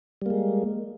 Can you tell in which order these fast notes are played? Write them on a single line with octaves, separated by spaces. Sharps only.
G3 A#3 G#3